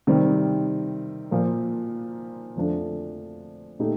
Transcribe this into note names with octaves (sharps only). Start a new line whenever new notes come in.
C3 D#3 G3 C4
A#2 F3 A#3
F2 D3 F3 A3 D4
A#2 A3 D#4 G4